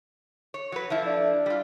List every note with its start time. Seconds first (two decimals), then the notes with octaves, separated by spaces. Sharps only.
0.54 C#5
0.72 F#3 F#4 B4
0.90 F3 A3 E4
1.06 D4
1.46 G3 F4